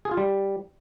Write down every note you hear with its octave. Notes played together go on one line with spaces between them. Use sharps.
G#4
F4
G3